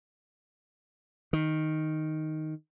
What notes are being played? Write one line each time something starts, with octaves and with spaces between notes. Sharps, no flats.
D#3